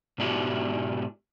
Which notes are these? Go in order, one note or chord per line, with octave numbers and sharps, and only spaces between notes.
G#2 B2 D4 E4 F#4 G4